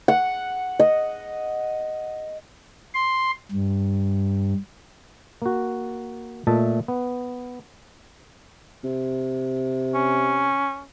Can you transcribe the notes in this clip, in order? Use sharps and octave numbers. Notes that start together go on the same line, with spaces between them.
F#5
D#5
C6
G2
A#3 F#4
A#2 A3 D#5 E5 A5
B3
C3
C#4